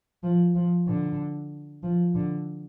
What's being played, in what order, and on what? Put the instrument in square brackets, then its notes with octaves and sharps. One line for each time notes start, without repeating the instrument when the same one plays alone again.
[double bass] F3
F3
D3
F3
D3